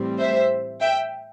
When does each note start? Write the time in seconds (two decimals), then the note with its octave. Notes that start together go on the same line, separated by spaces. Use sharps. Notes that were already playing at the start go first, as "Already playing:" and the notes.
Already playing: A2 E3 G3 C4
0.19 C5 E5
0.81 E5 G5